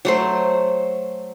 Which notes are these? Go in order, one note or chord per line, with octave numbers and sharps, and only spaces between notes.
F#3 A3 C5